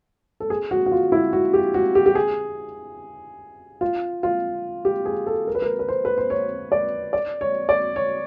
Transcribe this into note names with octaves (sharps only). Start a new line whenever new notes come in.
A4
G#4
F#4
F#4
F4
E4
F#4
G4
F#4
G4
G4
G#4
F4
F4
G4
G#4
A4
A#4
B4
A#4
B4
C5
B4
C5
C#5
D5
D5
C#5
D5
C#5